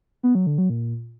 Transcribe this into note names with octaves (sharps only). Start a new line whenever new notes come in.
B3
F#3
D3
F#3
A#2